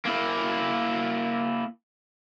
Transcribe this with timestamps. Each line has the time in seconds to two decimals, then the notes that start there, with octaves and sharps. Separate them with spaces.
0.06 A#3 E4